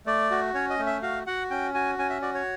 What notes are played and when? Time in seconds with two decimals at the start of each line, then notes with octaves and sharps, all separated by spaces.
0.06 A3 D5
0.31 F#4
0.54 C#4 C#5
0.70 D#5
0.79 A3
0.86 E5
1.02 F#4 F5
1.27 F#4 F#5
1.50 C#4 G5
1.74 F#4 G#5
1.98 C#4 G#5
2.10 E5
2.22 F#4 D5
2.34 C#5